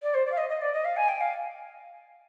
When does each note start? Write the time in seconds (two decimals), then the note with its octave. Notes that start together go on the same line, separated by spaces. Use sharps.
0.02 D5
0.14 C5
0.25 D5
0.31 F5
0.37 D#5
0.49 D#5
0.61 D5
0.73 D#5
0.84 F5
0.96 G#5
1.08 G5
1.20 F5